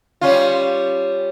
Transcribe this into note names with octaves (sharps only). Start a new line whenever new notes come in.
G3 C#4 F4